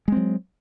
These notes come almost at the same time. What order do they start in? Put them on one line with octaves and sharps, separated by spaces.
G#3 C4 F#3